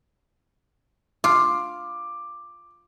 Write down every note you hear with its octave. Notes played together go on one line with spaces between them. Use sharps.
F4 D6